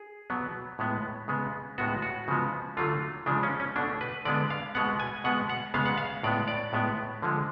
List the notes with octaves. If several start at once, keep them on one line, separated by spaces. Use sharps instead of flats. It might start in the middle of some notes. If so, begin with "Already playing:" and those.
Already playing: G#4
B2 F#3 B3
A2 G#3 B3
C#3 G#3 B3
A2 G#3 B3 F#4
F#4
C#3 F3 G#3 B3
D3 F#3 A3 F4
C#3 F3 G#3 D4
C#4
C#4
B2 A3 D4
B4
D3 G#3 B3 D5
F5
B2 G#3 B3 F#5
G#5
B2 G#3 B3 F#5
F#5
C#3 G#3 B3 F5
F#5
F5
A2 G#3 B3 D5
D5
A2 G#3 B3
D3 F3 G#3